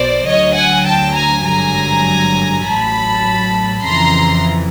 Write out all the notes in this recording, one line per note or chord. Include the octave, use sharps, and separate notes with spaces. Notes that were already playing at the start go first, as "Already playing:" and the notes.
Already playing: B1 B2 C5 D5
D2 D3 F#3 C#5 D#5
F#5 G#5
G5 A5
G#5 A#5
G#1 G2 D3 F#3 G#5 A#5
A1 A2 F#3 A5 B5
F2 C#3 E3 A#5 C6